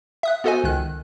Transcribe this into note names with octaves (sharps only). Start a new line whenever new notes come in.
E5 D#6 F#6
B3 F#4 A4 C5 D#5 G#5
C#2 D#3 F#6